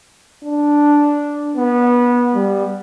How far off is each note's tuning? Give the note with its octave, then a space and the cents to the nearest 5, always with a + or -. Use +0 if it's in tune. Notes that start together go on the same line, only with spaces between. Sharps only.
D4 -5
B3 -20
G3 +5